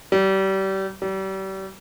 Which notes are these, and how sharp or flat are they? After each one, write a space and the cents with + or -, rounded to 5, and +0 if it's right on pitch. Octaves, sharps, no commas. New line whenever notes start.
G3 -30
G3 -35